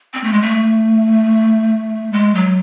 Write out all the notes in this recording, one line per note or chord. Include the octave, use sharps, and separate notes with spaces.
C4
A3
G#3
A3
G#3
F#3